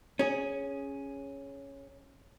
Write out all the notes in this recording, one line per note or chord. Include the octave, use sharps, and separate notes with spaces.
C#4 G#4